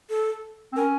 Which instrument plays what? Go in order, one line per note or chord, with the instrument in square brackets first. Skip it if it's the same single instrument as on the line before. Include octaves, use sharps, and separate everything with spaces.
[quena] A4
[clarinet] C4
[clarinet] C#4 [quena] A#4